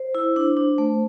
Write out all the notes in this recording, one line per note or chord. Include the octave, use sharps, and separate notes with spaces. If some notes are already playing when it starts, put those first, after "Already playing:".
Already playing: C5
E4
D4
D4
A3